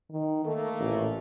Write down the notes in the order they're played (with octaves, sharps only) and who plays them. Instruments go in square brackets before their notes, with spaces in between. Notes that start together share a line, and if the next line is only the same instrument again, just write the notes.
[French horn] D#3
[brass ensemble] A3 A#3 [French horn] A4
[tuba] A1 [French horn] A#2